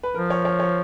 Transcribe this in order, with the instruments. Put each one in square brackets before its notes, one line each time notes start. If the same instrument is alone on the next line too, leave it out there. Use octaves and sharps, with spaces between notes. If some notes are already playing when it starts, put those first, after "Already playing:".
[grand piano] B4
[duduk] F3 [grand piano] A#4
[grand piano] C#5
C#5
C#5